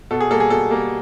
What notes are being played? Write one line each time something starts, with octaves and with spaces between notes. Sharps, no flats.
B2 A4
G#4
G3 A#3 A4
G#4
B2 A4
G3 A#3